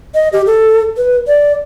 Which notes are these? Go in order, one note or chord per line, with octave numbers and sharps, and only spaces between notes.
D#5
G4
A4
B4
D5